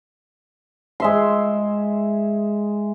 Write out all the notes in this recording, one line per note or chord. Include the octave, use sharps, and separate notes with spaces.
G#3 E5 C6